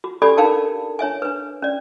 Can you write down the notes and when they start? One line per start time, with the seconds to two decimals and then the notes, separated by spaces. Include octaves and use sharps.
0.04 F#4
0.22 C#4 G4 A4 D5 G#5 B5
0.37 D4 D#4 A#4 F5 G5 A5
0.99 D4 C#5 E5 G#5
1.22 D4 B4
1.62 C#4 D5